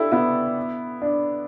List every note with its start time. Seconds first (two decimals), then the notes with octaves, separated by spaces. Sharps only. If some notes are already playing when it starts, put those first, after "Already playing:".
Already playing: D4 E4 G4 A4
0.12 B3 E4
1.02 D4